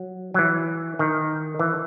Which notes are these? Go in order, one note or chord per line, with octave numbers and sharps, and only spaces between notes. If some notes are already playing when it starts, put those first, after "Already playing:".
Already playing: F#3
F#3
E3
D#3
E3